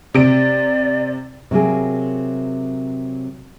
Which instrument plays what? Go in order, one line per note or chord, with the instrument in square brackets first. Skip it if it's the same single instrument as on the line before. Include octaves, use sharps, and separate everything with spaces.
[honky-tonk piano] C3 D7 [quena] D5
[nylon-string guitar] C3 F#3 A#3 G#4